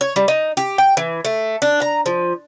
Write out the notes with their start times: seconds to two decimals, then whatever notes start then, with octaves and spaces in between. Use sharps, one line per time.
0.01 C#5
0.16 G3
0.28 D#4
0.57 G4
0.78 G5
0.97 E3
1.25 A3
1.62 D4
1.82 A#5
2.06 F3